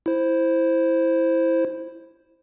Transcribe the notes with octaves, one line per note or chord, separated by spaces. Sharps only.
E4 C5